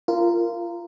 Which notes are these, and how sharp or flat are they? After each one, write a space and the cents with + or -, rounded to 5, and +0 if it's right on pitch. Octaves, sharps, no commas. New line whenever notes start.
F4 -20 A#4 -10